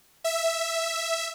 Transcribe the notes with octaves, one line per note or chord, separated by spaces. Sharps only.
E5